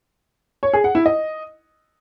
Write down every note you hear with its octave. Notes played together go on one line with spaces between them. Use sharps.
C#5
G#4
F#5
E4
D#5